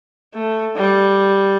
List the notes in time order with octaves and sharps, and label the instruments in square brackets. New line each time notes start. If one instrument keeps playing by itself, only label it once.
[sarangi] A3
G3